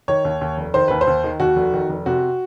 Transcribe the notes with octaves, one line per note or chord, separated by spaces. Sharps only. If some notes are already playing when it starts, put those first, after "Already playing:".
D#3 C#5
D#2
D#2
F1
D#3 C5
D#2 B4
C5
D#2
D#3
D#2 F#4
F1
D#3
F1
C3 F#4